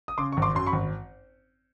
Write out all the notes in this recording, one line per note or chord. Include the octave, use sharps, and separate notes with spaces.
D#6
C#3 C6 D6
G#1 C#6
C6 D6
F#2 C6
B5 C#6
G#1